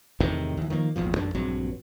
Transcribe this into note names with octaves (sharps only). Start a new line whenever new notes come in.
E2 A2 C3 D#3
D#2 E3
D#3 F3 A3 A#3
D#1 G#1 E2 F3
A1 F#2 D4
A#1 G2 F#3 C4